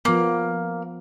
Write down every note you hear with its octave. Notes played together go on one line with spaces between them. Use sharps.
F3 A#3 B3